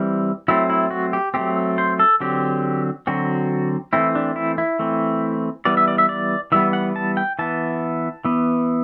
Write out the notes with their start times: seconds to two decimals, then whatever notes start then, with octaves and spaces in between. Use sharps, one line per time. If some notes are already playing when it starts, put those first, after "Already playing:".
Already playing: E3 G3 C4
0.48 F#3 A3 C4 E4
0.70 E4
0.91 F#4
1.13 G4
1.34 F#3 A3 C4 G4
1.78 C5
1.99 A4
2.20 D3 F#3 C4 G4
3.07 D3 F#3 C4 F#4
3.93 E3 A3 C4 E4
4.15 D4
4.36 E4
4.58 E4
4.79 E3 A3 C4
5.65 E3 G3 B3 D5
5.77 E5
5.88 D5
5.98 E5
6.09 D5
6.52 E3 G3 B3 E5
6.73 F#5
6.96 A5
7.17 G5
7.39 E3 B3 A5
8.25 E3 B3